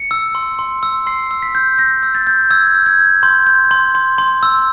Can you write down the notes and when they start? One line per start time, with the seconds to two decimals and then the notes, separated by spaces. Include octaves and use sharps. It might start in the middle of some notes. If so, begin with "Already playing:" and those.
Already playing: C#7
0.11 E6
0.35 C6
0.59 C6
0.83 E6
1.07 C6 C7
1.31 E6
1.42 B6
1.55 G6
1.78 E6 A#6
2.03 E6
2.15 A6
2.27 G6
2.51 E6 G#6
2.75 G6
2.86 G#6
2.99 G6
3.23 C6 G6
3.47 G6
3.71 C6
3.95 C6
4.18 C6
4.43 E6